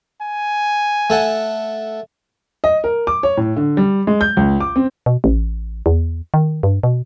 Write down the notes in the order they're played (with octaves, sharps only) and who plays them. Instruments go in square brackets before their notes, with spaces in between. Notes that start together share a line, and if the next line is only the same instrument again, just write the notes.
[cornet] G#5
[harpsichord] A3 A4 F#5
[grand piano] D#5
A#4
D6
C#5
A2
D3
G3
G#3
G6
C#2
D6
C4
[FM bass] B2
A1
E2
D#3
G2
B2